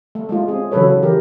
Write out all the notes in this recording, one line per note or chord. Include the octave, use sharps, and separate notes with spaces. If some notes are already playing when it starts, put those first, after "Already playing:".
A3
G#3 A3 F4
C4 G#4
C#3 E3 F#3 A4 B4 C#5
E3 G4 A#4